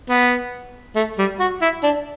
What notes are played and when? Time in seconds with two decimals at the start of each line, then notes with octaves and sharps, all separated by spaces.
0.09 B3
0.96 A3
1.18 G3
1.40 F#4
1.62 E4
1.83 D4